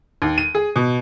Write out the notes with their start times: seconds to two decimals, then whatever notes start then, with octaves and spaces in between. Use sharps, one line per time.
0.22 D#2
0.38 D#7
0.55 G#4
0.76 B2